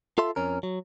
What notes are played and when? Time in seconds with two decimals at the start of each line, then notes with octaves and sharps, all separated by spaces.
0.18 F4 A4 E5 C6
0.36 F2 C#4 A#4
0.63 F#3